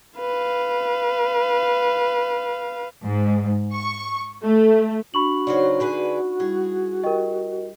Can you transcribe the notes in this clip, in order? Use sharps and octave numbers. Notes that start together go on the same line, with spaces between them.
B4 F5
G#2
C#6
A3
D4 F#4 B5 C#6 F#7
C#3 F#3 D#4 C5 D5
D3 G#4 B4
G3 E4 G#4
G4 A#4 D#5 G5 C#6